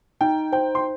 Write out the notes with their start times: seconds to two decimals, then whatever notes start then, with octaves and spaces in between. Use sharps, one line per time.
0.21 D#4 G5
0.52 C5 G5
0.75 C6